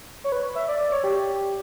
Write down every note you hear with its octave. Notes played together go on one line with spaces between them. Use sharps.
C#5
B4
E5
D5
D5
C#5
G4